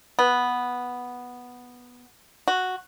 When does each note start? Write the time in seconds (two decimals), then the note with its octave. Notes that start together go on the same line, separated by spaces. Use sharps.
0.19 B3
2.48 F#4